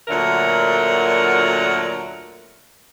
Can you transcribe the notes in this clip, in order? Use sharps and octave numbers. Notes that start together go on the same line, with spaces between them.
D2 A#2 D3 F#3 A3 A#4